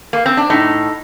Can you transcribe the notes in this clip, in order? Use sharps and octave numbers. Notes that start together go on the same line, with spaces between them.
A#3
C4
D4
A2 D#4